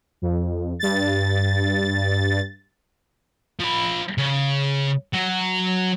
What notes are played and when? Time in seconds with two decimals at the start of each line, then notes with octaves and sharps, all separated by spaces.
0.22 F2
0.79 G2 A6
3.59 F3 B5
4.18 C#3
5.14 F#3 F#4